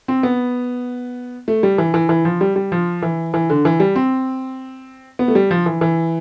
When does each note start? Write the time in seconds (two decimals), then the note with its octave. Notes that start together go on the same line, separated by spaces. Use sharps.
0.08 C4
0.23 B3
1.48 A3
1.63 G3
1.78 E3
1.94 E3
2.09 E3
2.25 F3
2.41 G3
2.56 G3
2.72 F3
3.03 E3
3.34 E3
3.50 D3
3.65 E3
3.80 G3
3.96 C4
5.19 B3
5.28 A3
5.35 G3
5.51 F3
5.66 E3
5.81 E3